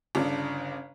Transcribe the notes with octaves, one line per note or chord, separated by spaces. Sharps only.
G1 C#3 D4